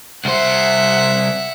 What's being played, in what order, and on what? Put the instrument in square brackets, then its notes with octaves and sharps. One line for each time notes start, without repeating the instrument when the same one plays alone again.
[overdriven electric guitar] C2 C5 [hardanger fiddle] E5 F#5